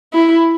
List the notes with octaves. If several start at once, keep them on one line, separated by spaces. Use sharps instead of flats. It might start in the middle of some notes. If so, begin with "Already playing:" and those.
E4